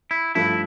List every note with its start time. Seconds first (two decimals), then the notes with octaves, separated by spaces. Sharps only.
0.11 E4
0.35 G2 F3 A3 E4